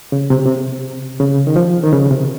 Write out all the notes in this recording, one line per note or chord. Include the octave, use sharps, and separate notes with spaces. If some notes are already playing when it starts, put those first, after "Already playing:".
C#3
C3
C#3
C3
C#3
D#3
F3
D#3
C#3
C3